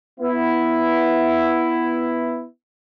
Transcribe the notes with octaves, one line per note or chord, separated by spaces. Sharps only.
B3 E4